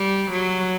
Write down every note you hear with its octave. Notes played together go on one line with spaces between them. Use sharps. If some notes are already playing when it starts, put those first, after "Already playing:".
Already playing: G3
F#3